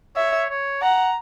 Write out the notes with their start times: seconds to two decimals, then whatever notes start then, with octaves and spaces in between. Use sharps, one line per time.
0.16 C#5 E5
0.50 C#5
0.82 F#5 A#5